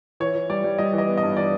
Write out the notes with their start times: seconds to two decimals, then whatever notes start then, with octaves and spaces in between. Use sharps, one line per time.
0.20 E3 C#5
0.35 E3
0.50 G3 D5
0.64 G3
0.78 G3 D#5
0.93 E3
0.98 D#5
1.07 B3
1.17 D#5
1.23 G2
1.37 E3 D5